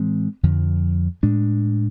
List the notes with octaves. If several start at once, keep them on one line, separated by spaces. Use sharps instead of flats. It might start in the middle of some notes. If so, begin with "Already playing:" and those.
Already playing: A2 E3 G#3 C4
F2 D3 F3
A2 G#3 D4